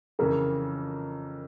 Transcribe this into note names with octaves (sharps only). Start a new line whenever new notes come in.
F2 C#3 E3 A#4